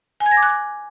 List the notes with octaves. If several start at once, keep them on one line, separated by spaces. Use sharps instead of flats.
G#5
G#6
A#6
D6
F#6